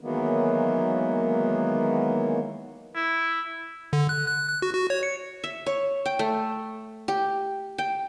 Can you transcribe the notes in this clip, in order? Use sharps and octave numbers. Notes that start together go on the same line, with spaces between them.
D#3 E3 F#3 G#3 A#3 B3
E4
D3
F#6
F#6
F#6
F#4
F#4
C#5
C#7
E5
C#5
G5
A3
G4
G5